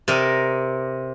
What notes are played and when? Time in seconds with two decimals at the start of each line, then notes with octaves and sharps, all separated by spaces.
0.08 C3 A#4 D5 D#5